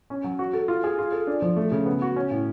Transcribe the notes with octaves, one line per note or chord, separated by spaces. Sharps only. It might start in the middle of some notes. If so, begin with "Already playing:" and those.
C#4
F#3
F#4
A4
F4
G#4
F4
A4
D4
F3
A3
C#3
B3
F#4
C#4
A2